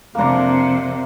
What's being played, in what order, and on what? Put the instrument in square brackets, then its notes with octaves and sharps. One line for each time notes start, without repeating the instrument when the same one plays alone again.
[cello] F2 C3 [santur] A#3 D4